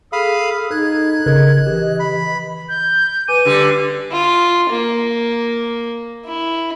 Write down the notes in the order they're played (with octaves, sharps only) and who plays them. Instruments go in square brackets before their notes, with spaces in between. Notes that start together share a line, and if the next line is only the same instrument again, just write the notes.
[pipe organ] G#4 A4 [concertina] F5 B5 D#6
[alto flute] D#4 [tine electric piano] A4 [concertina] F#6 [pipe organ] G#6
[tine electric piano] G#1 C#3 A#4 [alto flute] D#5
[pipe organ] E3 [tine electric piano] G4
[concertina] B5
[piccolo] G6
[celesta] B4 G#5 D6 [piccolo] D#7
[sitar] D3 G3
[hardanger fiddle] F4
A#3
E4